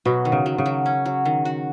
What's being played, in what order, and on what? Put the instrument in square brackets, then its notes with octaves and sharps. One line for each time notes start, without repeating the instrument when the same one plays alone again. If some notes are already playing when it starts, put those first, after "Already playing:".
[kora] B2 [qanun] F#3
[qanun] D#3
[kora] C#3
[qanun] F#3
[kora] C#3
[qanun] F#3
C#4
F#3
D#3
F#4